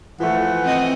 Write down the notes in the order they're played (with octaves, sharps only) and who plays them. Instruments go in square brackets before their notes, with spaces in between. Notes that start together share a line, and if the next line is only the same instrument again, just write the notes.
[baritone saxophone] E3 [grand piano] F3 A3 [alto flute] F#5
[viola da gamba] C4 D#5